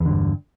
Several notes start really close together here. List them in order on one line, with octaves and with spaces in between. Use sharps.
E2 D3 G2